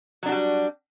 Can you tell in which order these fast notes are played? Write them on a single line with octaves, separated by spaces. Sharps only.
F#3 D4 F#4 G3